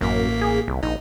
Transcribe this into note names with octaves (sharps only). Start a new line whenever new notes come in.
A1 F#2 A#3 B6
G#4
C2
A#1 D#4